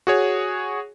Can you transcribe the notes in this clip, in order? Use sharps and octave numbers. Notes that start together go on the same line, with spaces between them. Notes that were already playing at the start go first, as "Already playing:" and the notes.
F#4 G#4 C#5